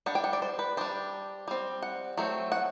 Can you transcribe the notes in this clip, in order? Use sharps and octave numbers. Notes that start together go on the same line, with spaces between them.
G3 D4 F#5
G5
F#5
D5
C5
B4
G3 D4 C5
G3 C4
F#5
F#3 A3 C4
F#5